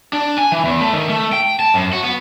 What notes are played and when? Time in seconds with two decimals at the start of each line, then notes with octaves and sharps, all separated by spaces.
0.13 D4
0.38 G#5
0.52 E3
0.65 E2
0.81 A3
0.93 D#3
1.09 A3
1.33 G5
1.60 A5
1.74 F#2
1.93 F#4
2.04 B3